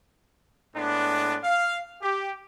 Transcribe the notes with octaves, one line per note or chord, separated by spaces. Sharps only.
A2 G#3 B3 D4
F5
G4